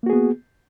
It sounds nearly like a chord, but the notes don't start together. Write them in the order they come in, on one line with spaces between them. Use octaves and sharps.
A#3 F#4 G#4 B3